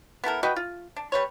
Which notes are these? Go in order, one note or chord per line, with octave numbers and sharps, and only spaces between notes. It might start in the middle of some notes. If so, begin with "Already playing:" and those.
B3 E4 A4 A#4
F#4 B4 D#5 G5
F4
D4
G3 B4 C#5